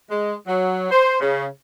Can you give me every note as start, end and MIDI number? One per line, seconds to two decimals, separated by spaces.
0.11 0.34 56
0.47 0.88 54
0.91 1.20 72
1.20 1.46 49